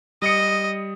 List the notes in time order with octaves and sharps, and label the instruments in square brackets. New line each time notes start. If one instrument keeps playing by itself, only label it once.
[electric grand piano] G3 D#6 C#7 [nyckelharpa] D#5